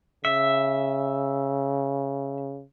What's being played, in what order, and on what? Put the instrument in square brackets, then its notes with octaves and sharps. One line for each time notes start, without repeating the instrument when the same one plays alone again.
[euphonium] C#3 [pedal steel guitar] E5